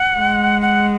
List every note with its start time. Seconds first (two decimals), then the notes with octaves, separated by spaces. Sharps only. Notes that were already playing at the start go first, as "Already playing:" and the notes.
Already playing: F#5
0.18 G#3
0.62 F#5